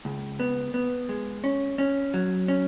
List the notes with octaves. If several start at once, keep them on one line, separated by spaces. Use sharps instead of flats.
C#2
B3
B3
G#3
C#4
C#4
F#3
C#4